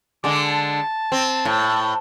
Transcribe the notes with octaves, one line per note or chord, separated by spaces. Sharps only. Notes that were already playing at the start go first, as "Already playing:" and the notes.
D3 G#3 D6
A5
C4
A2